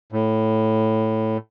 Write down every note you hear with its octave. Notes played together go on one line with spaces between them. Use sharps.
A2